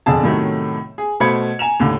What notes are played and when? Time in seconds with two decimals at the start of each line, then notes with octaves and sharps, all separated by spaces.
0.06 E1 F2 D3 G#4 A5
0.23 A2 C3 D#3 F#3 A3
0.98 G#4
1.20 B2 A3 C5 B5 G#6 C#7
1.59 G#5 A#5 E7 F7
1.80 D#2 A2 D3